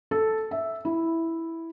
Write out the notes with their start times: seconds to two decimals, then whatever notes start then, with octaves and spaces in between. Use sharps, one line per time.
0.11 A4
0.51 E5
0.85 E4